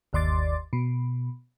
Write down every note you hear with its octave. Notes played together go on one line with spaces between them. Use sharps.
G1 D#2 D5 C6 D6 A6
B2